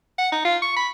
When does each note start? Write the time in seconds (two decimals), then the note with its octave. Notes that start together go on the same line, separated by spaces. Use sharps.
0.18 F#5
0.32 D#4
0.45 F4
0.62 C#6
0.77 B5